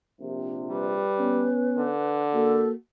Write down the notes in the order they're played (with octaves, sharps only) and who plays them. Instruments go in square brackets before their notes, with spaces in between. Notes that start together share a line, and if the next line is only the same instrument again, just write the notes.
[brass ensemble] A#1 C3
[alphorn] G3 [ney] B4
[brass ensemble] B3 C#4
[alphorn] D3
[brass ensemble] A#3 F#4 [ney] A4